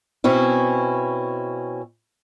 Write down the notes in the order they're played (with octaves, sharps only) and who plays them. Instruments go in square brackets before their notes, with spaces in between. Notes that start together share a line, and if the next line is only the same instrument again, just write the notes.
[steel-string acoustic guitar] B2 C4 C#4 E4